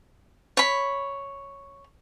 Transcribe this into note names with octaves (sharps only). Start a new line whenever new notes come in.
C#5 B5